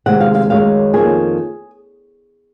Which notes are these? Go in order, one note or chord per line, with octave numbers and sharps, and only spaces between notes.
C3 D#3 G#3 C4 F#5
F5
F5
F#2 D#3 G#3 C#4 F5
F2 D#3 A#3 C#4 G#4